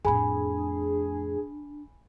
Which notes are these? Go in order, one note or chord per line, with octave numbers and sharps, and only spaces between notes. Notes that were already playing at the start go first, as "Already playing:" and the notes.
F2 A2 D4 G#4 G#5 B5